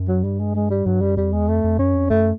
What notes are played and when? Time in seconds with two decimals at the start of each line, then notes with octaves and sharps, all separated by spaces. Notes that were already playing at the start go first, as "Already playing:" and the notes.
Already playing: F#2
0.08 F#3
0.24 G2 G3
0.39 G#3
0.55 G#3
0.70 G3
0.86 G2 F#3
1.01 F#2 G3
1.17 F2 G3
1.33 E2 G#3
1.48 F2 A3
1.64 F2
1.79 F#2 C#4
1.95 F2
2.10 F#2 A3